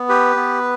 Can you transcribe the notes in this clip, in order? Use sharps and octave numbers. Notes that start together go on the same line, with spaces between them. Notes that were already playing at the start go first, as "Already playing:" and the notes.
Already playing: B3
G4 B4
B3